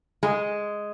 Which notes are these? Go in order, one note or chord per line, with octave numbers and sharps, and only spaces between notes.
G#3